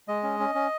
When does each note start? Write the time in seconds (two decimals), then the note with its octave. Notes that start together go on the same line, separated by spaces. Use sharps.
0.08 G#3 D#5
0.23 C#4
0.40 C#4
0.55 C#4